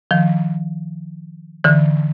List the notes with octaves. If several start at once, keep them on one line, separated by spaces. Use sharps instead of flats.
D#3 F3
D3 E3